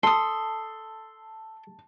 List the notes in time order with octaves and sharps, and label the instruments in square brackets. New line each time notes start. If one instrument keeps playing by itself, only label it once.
[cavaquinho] A4 D#6 [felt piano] A5 [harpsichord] C6